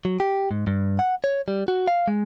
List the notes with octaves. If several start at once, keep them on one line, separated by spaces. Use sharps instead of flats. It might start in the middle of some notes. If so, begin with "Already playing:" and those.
F#3
G4
G#2
G2
F#5
C#5
G3
F#4
F5
G#3